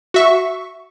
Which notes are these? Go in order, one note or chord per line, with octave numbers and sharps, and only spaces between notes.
F#4 E5 C#6